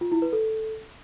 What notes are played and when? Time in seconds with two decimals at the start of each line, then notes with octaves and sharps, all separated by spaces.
0.01 F4
0.12 E4
0.22 B4
0.33 A4